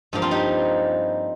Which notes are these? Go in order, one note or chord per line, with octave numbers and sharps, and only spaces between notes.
G2 F3 A#3
C4 F4
D#4 G4